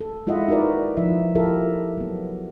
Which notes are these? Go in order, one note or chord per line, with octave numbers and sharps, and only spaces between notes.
A4
G#3 E4 F4 D#5 E5 F#5
D#4 F#4 A#4 B4 D5
F3 D#4 E4 E5
E4 F4 G4 A4 A#4 E5
F#3 B3